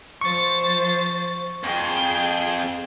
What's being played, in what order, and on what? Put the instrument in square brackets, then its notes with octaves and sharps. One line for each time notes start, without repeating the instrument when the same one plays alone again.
[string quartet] F3 C5 A6 [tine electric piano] C#6
[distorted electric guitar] F2 [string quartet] G#4 G5